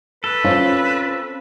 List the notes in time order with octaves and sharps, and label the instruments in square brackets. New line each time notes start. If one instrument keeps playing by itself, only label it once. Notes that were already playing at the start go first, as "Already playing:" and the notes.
[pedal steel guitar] A4 [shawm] B4
[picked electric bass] C4 C#4 [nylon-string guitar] F4